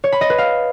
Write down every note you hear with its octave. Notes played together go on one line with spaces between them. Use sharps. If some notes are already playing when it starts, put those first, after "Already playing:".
C#5
B5
D#5
B4
F5